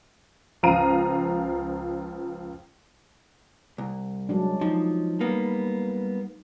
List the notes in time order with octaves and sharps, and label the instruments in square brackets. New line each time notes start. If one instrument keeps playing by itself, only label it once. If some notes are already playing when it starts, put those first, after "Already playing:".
[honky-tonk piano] C#2 F3 F5 A#5 D#7
[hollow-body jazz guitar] C2
[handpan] F#3 G#3 D4
[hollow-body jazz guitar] F3 [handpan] D#4
[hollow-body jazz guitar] G3 A#3 B3